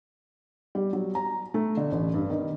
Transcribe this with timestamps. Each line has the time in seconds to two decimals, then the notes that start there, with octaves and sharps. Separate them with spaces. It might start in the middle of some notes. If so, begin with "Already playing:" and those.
0.75 G3
0.93 F#3
1.15 A#5
1.54 A3
1.77 D3
1.92 A1
2.14 G2
2.30 D#3